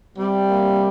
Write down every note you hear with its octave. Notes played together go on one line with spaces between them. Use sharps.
C3 G3
A#3